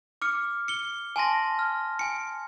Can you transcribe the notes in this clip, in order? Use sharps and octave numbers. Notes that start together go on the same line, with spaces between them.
D6 F6 C#7
C#7 G7
G#5 A5 C6 A#6
F6
G#5 C#7